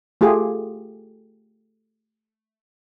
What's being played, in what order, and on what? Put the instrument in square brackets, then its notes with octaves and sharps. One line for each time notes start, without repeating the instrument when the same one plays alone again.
[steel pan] A3 F4 G4 G#4